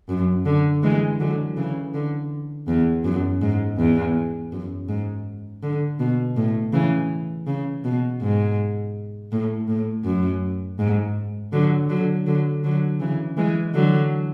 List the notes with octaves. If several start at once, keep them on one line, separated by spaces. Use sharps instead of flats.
F#2
D3
E3 G#3
D3 F#3
C#3 E3
D3
E2
F#2
G#2
E2
F#2
G#2
D3
B2
A2
C#3 E3
C#3
B2
G#2
A2
A2
F#2
G#2
D3 F#3
D3 F#3
D3 F#3
D3 F#3
C#3 E3
E3 G#3
D3 F#3